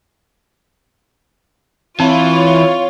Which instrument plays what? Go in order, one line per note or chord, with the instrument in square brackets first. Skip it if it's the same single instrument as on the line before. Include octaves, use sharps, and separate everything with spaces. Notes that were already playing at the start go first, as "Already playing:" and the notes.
[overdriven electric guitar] E3 [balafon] C4 [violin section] F4 C#5